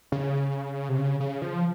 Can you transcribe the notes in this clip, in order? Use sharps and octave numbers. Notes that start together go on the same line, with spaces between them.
C#3
C3
C#3
C#3
F3